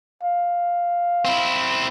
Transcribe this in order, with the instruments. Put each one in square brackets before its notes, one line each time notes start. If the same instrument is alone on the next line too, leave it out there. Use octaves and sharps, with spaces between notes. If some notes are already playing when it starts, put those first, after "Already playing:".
[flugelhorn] F5
[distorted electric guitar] C4 E4